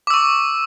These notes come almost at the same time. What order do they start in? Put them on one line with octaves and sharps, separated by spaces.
D6 E6 C#6